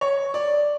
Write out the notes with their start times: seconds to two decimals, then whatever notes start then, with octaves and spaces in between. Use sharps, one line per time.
0.01 C#5
0.34 D5